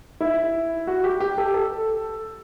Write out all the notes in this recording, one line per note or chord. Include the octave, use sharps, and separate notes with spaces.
E4
F#4
G4
G4
A4
A4